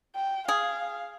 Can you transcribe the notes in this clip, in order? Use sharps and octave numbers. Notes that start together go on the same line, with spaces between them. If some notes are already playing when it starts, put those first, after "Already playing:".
G5
G#4 F5